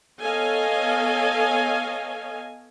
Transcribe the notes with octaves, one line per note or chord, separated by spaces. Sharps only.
B3 A4 C#5 D#5 F5 G#5